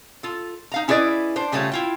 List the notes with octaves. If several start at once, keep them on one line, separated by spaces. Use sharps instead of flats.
F4 A4
D#4 F5 A#5
C#4 E4 G#4 B4 D5 D#5
D4 C5
C#3 G3 A3 F4 G4 C#5
E4 F4 G5